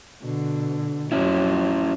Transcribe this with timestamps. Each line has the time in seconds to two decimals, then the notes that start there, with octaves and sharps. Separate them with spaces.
0.23 B2 D3
1.12 F2 F#3 C#4 E4